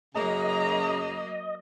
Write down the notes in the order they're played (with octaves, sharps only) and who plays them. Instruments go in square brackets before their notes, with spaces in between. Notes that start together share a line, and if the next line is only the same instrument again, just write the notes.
[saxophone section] F#2 C#3 [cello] F#3 A#3 [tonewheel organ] D#5 [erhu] A#5